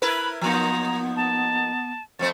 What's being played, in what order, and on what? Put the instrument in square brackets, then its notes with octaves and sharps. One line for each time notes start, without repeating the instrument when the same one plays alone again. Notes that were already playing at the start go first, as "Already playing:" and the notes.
[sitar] E4 A#4 B4 [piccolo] B5
[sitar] F3 A#3 D#4 [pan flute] B3 [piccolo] A#5
[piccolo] A5
[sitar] F2 A3 C4 [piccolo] A6